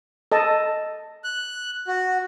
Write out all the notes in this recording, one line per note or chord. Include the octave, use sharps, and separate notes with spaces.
A4 D#5 A5
F#6
F#4